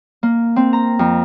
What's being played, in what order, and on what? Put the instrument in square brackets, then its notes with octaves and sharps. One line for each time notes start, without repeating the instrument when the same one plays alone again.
[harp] A#3
C4
A#5
F2